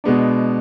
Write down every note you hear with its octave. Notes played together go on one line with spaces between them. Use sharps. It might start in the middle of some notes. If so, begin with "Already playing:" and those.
B2 G#3 B3 D4